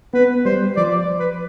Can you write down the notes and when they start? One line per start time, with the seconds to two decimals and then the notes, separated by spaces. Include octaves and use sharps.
0.14 B3 B4
0.45 G3 C5
0.77 F3 D5
1.19 B4